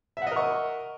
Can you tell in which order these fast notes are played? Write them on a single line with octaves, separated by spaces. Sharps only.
E5 F#5 D#5 A#4 C#6